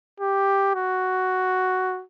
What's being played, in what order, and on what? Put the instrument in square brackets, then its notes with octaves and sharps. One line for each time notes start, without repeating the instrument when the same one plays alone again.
[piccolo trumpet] G4
F#4